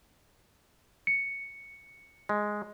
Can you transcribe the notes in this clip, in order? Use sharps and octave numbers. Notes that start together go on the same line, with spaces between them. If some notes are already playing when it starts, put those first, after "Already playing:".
C#7
G#3